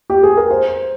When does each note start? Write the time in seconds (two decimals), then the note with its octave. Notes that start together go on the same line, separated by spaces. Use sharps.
0.10 G4
0.23 G#4
0.37 A#4
0.51 C5